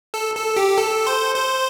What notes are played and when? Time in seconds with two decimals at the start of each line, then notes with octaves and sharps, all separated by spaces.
0.14 A4
0.35 A4
0.56 G4
0.78 A4
1.07 C5
1.35 C5